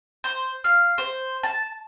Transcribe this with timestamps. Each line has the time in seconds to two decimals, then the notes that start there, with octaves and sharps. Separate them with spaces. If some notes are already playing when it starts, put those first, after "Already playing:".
0.24 C5
0.64 F5
0.98 C5
1.43 A5